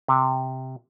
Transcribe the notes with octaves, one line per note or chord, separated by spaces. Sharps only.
C3